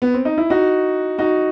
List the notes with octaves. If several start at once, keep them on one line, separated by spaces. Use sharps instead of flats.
B3
C4
D#4
E4
D#4 F#4
D#4 F#4